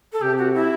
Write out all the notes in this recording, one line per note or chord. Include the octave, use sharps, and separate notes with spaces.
A4
C3 G4
F#4
E4